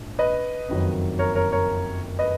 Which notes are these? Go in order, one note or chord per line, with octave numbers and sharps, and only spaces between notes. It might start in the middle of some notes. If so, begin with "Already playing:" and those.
Already playing: A#1 G#2
B4 D#5
F#1 F2 D#3 F#3
A#4 C#5
A#4 C#5
A#4 C#5
B4 D#5